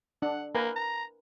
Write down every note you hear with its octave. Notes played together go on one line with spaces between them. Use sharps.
D4 F#5
A#3 A#4 B4 G#5
A#5